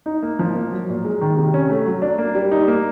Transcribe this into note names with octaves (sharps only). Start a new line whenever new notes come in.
D#4
A#3
F3
A#3
F#3
A#2
G#3
D#3
C3
C#4
A3
F#3
D4
A#3
G3
D#4
A#3